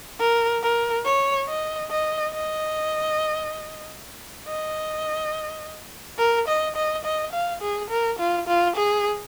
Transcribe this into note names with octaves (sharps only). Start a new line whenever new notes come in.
A#4
A#4
C#5
D#5
D#5
D#5
D#5
A#4
D#5
D#5
D#5
F5
G#4
A#4
F4
F4
G#4